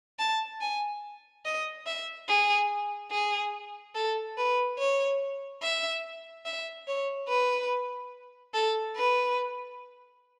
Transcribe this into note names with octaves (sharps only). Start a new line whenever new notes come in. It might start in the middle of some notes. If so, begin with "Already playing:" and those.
A5
G#5
D#5
E5
G#4
G#4
A4
B4
C#5
E5
E5
C#5
B4
A4
B4